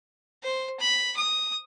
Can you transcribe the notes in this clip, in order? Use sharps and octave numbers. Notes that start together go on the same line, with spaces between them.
C5
B5
D#6